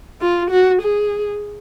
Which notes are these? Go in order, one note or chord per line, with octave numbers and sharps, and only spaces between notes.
F4
F#4
G#4